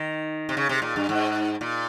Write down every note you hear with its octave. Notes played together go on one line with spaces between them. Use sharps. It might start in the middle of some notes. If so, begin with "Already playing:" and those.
Already playing: D#3
C3
C#3
C3
A#2
G2
G#2
A#2